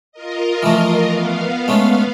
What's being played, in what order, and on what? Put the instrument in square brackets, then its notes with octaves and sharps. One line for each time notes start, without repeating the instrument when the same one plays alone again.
[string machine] F4 A#4 D#5
[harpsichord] E3 F3 A3
[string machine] B3 F5
[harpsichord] G#3 A3 C#4